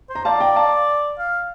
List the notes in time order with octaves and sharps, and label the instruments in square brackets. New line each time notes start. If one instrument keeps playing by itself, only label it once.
[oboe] C5
[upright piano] A#5
[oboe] D5 [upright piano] F5 A5
[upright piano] G5 A#5
F5 A5
[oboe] F5